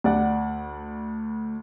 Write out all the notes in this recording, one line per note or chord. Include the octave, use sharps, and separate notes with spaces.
D2 D5 F#5